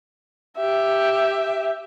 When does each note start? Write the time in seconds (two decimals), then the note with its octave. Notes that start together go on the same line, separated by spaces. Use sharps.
0.57 G4 E5